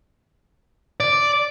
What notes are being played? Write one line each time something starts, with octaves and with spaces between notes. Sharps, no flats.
D5